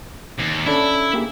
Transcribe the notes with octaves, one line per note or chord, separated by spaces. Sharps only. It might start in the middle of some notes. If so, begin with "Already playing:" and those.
D#2
C#4 D4 E4 A4
A#3 G4 G#4